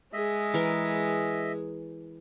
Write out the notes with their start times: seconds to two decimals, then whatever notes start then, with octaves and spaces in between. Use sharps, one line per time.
0.13 G#3 G#4 D#5 E5
0.54 E3 A#4